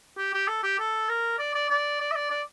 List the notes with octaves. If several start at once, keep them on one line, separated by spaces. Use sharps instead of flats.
G4
G4
A4
G4
A4
A#4
D5
D5
D5
D5
E5
D5
D5